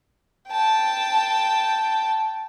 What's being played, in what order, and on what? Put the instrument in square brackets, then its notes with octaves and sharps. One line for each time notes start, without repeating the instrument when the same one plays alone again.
[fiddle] G5 A5